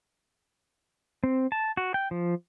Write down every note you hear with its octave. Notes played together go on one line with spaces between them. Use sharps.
C4
A5
F#4
G5
F3